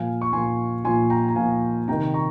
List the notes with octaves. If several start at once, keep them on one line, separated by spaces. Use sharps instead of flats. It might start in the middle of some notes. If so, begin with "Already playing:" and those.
Already playing: A#2 F3 F5 G#5
C#6
A#2 F3 G#5 C6
A#2 F3 G#5 C6
G5 A#5
A#5
A#2 F3 F5 G#5
C3 D#3 G5 A#5
A#5 C#6